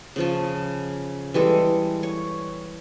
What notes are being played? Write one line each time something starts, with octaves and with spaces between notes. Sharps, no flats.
C#3 F3 A5
E3 G3 G#3 A4
C#5